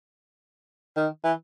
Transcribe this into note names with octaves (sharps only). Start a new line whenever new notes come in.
D#3
E3